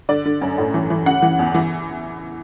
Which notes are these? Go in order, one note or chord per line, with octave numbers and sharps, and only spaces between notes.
D3 D5
D3
F#2
A2
E3
E3
C#3 F#5
E3
E2
E3